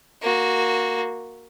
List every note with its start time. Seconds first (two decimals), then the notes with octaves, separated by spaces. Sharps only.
0.22 A#3 F#4